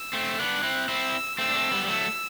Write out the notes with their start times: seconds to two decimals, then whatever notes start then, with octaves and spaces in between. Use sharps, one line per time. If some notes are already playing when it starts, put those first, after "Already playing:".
Already playing: E6
0.13 A3 C4
0.39 B3 D4 F#6
0.63 C4 E4
0.88 C4 E4 E6
1.38 A3 C4 E6
1.49 D4
1.55 A3 C4
1.71 G3 B3
1.83 G3
1.88 F#3 A3 E6